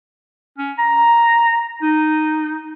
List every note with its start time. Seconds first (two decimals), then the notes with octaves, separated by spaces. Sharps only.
0.58 C#4
0.79 A#5
1.82 D#4